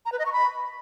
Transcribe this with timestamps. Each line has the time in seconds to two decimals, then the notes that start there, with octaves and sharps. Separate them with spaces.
0.05 A#5
0.12 B4
0.19 D#5
0.26 C#6
0.32 B5